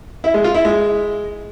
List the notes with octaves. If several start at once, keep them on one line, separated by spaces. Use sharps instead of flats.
E4
G#3
F4
E4
G#3